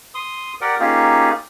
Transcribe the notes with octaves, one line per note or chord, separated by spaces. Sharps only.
C6 D#6
G4 A#4 D5 F#5 G5
A#3 C#4 D#4 F4 G4 G#4